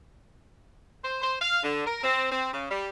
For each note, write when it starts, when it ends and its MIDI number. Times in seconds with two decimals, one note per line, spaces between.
1.03 1.19 72
1.22 1.36 72
1.41 1.59 77
1.63 1.86 50
1.86 2.02 70
2.04 2.27 60
2.31 2.53 60
2.53 2.65 49
2.70 2.88 55